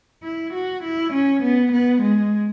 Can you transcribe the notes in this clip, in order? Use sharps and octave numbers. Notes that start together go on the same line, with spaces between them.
E4
F#4
E4
C#4
B3
B3
G#3